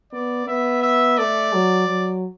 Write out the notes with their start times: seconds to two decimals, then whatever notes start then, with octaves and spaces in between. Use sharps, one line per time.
0.12 B3 D5
0.47 B3 E5
0.83 E5
1.18 A3 D5
1.53 F#3
1.88 F#3